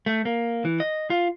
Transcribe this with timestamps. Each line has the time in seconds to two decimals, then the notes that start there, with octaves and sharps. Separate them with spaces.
0.06 A3
0.25 A#3
0.65 E3
0.80 D#5
1.10 F4